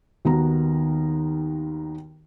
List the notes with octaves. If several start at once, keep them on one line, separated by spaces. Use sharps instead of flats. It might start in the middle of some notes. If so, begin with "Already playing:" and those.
D#2 D#3 B3 F#4 A#5